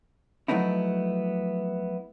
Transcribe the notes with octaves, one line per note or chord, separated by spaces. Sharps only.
F3 F#3 A3 B3 D#4 E4